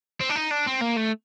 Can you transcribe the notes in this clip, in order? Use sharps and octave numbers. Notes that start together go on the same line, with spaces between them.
C4
D4
D#4
D4
C4
A#3
A3